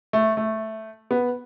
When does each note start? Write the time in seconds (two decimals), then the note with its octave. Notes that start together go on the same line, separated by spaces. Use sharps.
0.13 A3
0.37 A3
1.11 B3